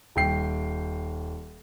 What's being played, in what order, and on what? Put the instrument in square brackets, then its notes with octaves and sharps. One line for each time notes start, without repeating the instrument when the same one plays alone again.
[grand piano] D#1 G5 C7